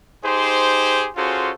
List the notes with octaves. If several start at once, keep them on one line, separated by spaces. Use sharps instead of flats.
D#4 G4 G#4 C5
C#4 F4 F#4 G#4 A4 C5